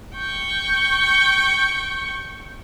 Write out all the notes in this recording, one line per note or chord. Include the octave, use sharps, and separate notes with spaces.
G5 C#6